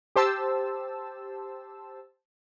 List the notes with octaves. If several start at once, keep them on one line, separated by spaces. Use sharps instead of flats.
G4 C5 A5 E6